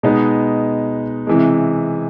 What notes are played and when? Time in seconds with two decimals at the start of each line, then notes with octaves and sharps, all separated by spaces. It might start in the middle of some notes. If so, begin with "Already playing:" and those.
0.03 B2 G#3 B3 D#4
1.27 C3 E3 G#3